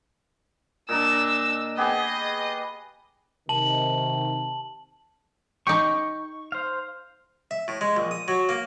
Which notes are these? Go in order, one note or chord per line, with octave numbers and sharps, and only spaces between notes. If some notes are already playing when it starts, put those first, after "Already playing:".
A#2 D4 D#5 A#5 E6
B3 G4 G#4 D#5
C3 D#3 A5 F#7
D#4 G4 C#6
C5 F5
E5
A2
G#3
A#1
D#6
F#3
A#3